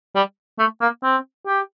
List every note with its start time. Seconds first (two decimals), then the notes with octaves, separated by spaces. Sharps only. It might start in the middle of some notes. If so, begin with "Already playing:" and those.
0.15 G3
0.59 A3
0.81 A#3
1.03 C4
1.47 G4